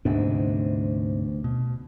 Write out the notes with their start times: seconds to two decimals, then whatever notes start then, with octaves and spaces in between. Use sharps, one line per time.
0.05 D2 G#2 C3 B3 D4
1.44 B2